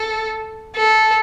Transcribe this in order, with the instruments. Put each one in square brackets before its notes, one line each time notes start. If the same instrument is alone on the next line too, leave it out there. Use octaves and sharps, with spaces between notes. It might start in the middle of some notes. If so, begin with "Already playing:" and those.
Already playing: [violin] A4
A4